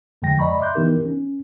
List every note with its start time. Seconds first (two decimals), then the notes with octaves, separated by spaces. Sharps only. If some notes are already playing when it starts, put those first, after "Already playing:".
0.22 F2 D3 F3 G#3 G5 A#6
0.39 D5 D#5 A#5 B5 C#6
0.59 E5 C6 D6 F#6 G6
0.75 E3 B3 D#4 G4 A#4
1.06 C#4